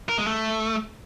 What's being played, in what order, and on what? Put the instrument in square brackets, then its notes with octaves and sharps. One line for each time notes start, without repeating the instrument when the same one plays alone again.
[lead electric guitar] A#4
G#3
A3